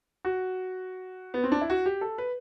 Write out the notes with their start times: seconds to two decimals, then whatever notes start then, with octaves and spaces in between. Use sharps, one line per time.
0.25 F#4
1.34 B3
1.43 C4
1.52 D4
1.61 E4
1.70 F#4
1.86 G4
2.01 A4
2.18 B4